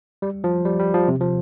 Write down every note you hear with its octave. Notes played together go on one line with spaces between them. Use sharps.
G3
F3
G3
G3
F3
C3
F3